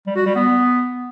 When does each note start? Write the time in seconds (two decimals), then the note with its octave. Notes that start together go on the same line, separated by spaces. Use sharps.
0.07 G3
0.16 F#4
0.26 G3
0.35 B3